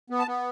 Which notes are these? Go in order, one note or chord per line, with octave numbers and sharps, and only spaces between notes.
B3
A5
B3